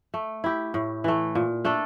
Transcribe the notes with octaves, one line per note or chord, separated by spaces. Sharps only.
A3
E4 G4
A2
E3 A3
A#2
A3 D4 A4